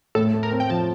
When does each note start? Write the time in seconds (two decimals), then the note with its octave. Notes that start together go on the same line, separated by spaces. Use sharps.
0.15 A2 A4
0.33 A3
0.43 A#4
0.52 C4
0.60 G5
0.70 F3 A5